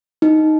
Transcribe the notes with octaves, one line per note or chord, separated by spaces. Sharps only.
D#4